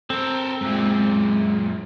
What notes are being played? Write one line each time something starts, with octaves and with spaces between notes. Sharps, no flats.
C4 A4 A#4
F#2 A#2 G#3